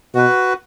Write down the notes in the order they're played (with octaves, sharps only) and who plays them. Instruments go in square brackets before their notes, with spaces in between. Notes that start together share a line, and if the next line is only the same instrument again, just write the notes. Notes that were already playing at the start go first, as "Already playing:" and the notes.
[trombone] B2 [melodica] F#4 B4